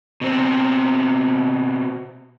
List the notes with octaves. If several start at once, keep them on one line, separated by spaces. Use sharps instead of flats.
B2 C4